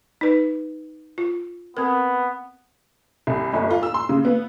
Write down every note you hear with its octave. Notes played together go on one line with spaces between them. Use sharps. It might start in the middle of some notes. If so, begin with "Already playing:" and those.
D#4 B4
F4
B3 C4 A#4
C2
G1
F4
E6
C6
C#3
B3